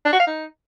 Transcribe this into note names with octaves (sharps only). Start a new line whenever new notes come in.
D4
F#4
F5
D#4